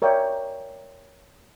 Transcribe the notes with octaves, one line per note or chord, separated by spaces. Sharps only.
A#4 C#5 D5 E5 G5